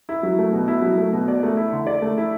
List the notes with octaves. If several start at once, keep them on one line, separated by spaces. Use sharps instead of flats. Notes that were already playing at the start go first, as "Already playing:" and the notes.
E4
F#3
A3
B2
E4
F#3
A3
B2
D5
A3
E4
D3
D5
A3
E4